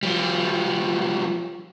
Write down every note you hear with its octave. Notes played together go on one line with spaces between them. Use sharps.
F3 G3